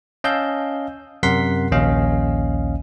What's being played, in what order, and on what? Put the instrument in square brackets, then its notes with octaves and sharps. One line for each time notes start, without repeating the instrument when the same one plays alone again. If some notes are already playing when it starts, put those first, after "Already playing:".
[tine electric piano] C#4 D#5 F5 A5 E6 G6
F#2 C3 A#4 F#5 C6 B6
A#1 D#2 C#4 D#5 F5